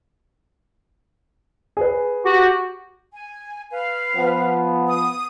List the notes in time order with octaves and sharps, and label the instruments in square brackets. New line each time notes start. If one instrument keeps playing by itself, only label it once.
[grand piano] G#4 B4
[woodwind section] F#4 G4
G#5
B4 F5
[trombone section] F3 B3
[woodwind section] D#6